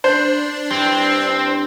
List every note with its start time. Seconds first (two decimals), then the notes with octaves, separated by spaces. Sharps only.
0.04 D4 C5
0.71 G2 C4 E4